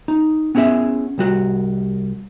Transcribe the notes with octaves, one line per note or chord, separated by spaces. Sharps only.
D#4
B3 C#4 E4 G#4 E5
C2 G3 F#4